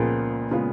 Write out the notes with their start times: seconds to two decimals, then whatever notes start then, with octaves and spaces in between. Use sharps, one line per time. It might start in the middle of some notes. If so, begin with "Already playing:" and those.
Already playing: C#2 A#2 C#3 F3 B3
0.51 C#3 G#3 B3 F4